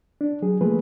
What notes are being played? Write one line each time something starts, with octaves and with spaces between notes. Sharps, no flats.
D4
F#3 G#4
F3 A3 A#3 G#4 B4